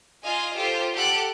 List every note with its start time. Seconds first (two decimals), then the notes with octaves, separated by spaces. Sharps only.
0.24 F4 D#5 F5 G#5
0.55 F4 G4 A4 C5
0.94 G4 A4 F#5 F#6 D7